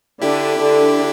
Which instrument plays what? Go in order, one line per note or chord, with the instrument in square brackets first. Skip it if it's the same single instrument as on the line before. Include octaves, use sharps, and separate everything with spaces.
[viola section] D3 D4 [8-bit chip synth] E4 G4
[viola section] D3 D4